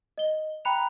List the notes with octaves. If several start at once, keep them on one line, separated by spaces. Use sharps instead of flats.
D#5 G7
G5 A#5 B5 F#6 C#7 F7